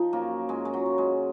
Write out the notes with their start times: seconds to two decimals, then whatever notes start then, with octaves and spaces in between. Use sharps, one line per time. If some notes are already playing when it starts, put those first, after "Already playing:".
Already playing: F3 D#4
0.13 F#2 A#3
0.49 F#2 G#3
0.65 G#3
0.74 F#3
0.86 C#3
0.98 G#3